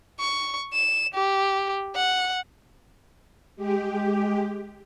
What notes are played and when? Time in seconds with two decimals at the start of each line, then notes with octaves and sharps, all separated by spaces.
0.20 C#6
0.73 E7
1.14 G4
1.95 F#5
3.56 G#3 G4